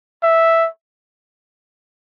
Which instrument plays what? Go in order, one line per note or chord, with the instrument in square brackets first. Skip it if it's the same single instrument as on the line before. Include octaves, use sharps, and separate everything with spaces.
[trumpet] E5